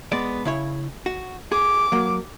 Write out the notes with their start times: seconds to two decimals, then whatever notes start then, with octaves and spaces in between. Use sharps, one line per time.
0.12 G#3 B3 D5
0.45 C#3 E4 C#5
1.06 F#4
1.52 G#4 D6
1.92 F#3 A#3